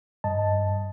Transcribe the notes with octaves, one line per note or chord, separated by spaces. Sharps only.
G2 D#5 A5